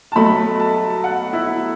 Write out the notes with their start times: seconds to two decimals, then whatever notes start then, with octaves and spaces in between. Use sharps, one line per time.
0.12 A5
0.15 B2 F#3 A3 B5
0.60 A5
1.04 F#5
1.33 E4